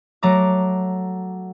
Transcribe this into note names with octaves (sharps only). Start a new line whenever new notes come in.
F#3 A3 A#5 D6